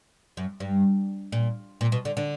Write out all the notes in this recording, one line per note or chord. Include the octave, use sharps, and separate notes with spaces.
F#2
G2
A#2
A#2
B2
D3
D3